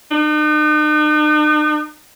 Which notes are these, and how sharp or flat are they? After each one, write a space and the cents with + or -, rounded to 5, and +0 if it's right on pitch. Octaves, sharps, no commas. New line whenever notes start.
D#4 -45